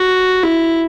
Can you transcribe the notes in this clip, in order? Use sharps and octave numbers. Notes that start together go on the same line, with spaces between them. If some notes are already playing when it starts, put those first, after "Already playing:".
Already playing: F#4
E4